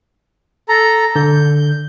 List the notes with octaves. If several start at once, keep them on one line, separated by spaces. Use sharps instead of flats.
A4 A#5
D3 G6